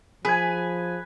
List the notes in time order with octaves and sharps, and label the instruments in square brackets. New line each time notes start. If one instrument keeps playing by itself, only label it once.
[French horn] F3 [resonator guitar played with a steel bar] G#4 [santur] B4 G#5